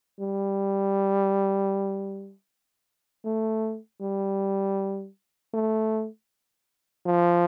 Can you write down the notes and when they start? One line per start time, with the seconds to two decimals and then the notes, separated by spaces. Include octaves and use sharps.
0.20 G3
3.25 A3
4.01 G3
5.54 A3
7.06 F3